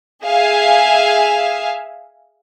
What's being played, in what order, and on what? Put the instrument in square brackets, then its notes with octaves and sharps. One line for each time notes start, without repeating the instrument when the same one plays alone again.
[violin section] G#4 E5 F5 G#5